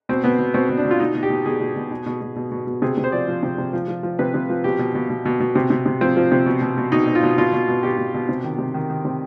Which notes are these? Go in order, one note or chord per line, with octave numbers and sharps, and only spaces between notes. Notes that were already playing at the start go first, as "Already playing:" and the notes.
B2 C4
B2 B3
B2
B2 C4
B2
D4
B2
F4
B2 D#4
B2
G4
B2
B2 G#4
B2
B2
B2
B2
B2
B2
B2
B2
C3 G#4
C3
C5
F3 D5
F3
C3
C3
F3
F3
F3
C3 B4
C3
F3
B2 G4
B2
B2
B2
B2
B2
C3
C3
C3
F3 C4
F3
C3
B2
B2
B2
B2 D#4
B2
F4
B2
B2 F4
B2
B2
B2 G4
B2
B2
C3
D#3
C3
D#3
D#3
C3